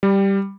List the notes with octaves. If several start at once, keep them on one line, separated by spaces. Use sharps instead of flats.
G3